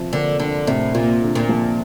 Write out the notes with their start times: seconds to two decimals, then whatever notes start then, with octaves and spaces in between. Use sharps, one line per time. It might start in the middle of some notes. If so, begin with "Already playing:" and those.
Already playing: C3 F3
0.13 D3 A#3
0.40 D3 D4
0.67 A2 C3
0.94 A#2 F4
1.22 D3
1.35 A#2
1.49 F3